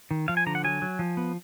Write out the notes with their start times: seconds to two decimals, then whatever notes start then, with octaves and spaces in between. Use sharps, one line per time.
0.11 D#3
0.28 F3 F5
0.37 G#5
0.46 D3 A#5
0.55 F#5
0.64 F#3 G#5
0.82 F#3
0.99 F3
1.17 B3